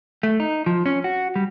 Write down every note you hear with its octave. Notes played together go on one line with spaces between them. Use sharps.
A3
D#4
F3
C#4
F#4
G3